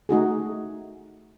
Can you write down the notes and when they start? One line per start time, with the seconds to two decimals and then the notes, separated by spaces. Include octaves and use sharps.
0.09 A3 D#4 F#4 G#4